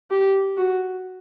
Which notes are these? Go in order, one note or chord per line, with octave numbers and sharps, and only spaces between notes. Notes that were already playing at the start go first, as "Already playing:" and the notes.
G4
F#4